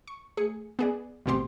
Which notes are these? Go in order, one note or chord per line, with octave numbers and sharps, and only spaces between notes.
C#6
A3 G#4 C#7
B3 G#4 D5
A1 D#2 B2 C4 G4 C6